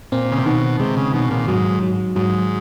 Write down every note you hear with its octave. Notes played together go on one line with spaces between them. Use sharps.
A#2 C4
C#3
C3
B2 D#3
C3 G#3
C#3
B2 D#3
A#2
G#2 F#3
F#3
G#2 F#3